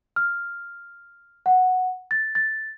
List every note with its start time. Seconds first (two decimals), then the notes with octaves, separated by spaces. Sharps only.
0.16 F6
1.46 F#5
2.11 A6
2.35 A6